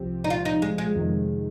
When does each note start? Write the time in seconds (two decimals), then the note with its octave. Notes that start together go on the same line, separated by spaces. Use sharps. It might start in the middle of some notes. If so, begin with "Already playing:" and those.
Already playing: C2 C3 F3 C4 G4
0.24 D#4
0.30 F4
0.45 D#4
0.62 G#3
0.78 G#3
0.95 F2 C3 D#3